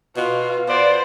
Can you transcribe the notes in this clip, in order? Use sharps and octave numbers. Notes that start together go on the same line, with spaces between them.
B2 F4
B3 C5 D5